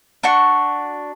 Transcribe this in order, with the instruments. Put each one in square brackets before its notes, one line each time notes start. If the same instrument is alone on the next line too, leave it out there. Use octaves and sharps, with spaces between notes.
[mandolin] D4 F#4 C#6